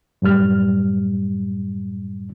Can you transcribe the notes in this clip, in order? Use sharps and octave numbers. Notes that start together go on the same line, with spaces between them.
F#2 A2 G3 F6